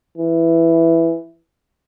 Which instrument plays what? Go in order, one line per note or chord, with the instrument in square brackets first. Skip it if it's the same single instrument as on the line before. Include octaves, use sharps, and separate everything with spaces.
[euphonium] E3